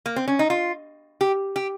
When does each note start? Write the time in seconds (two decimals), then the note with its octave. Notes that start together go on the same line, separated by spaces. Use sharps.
0.06 A#3
0.16 C4
0.28 C#4
0.39 D#4
0.50 F4
1.21 G4
1.56 G4